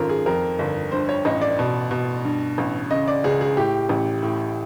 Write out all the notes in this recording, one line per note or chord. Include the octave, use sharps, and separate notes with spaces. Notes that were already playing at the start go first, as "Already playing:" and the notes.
Already playing: G#1 F#2 F4 A4 A#4
G#4
F2 A#4
G1
G2 C5
C#5
A1 D#5
D5
B2
B2
G2
A1
C#3 D#5
D5
C#2 G#4
G#4
A2 G4
A1
A2